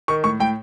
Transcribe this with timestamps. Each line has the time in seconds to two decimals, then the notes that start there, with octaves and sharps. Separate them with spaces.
0.08 D#3 C#6
0.24 A2 C#6
0.40 A2 G5